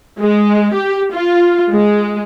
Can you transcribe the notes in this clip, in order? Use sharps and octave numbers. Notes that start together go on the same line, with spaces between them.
G#3
G4
F4
G#3